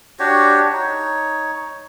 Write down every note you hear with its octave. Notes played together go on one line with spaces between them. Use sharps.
D4 F#4 G4 C#5
D#4 C#5